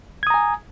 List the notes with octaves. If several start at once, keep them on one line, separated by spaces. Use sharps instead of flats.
G#5 A#5 D#6 G#6